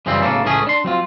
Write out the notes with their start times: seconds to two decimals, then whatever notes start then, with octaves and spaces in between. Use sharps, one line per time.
0.06 F#2 C#3 E3 G3 C4
0.22 B1 A2 C#3 A#3 A4
0.45 C#2 A2 E3 A3 C#4 G#4
0.67 D4 C6
0.84 F#3 C4 F4